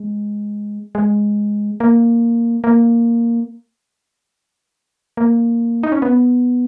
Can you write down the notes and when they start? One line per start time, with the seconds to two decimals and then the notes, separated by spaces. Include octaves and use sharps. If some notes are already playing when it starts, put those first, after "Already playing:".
Already playing: G#3
0.95 G#3
1.80 A#3
2.64 A#3
5.17 A#3
5.83 D#4
5.92 C#4
6.02 B3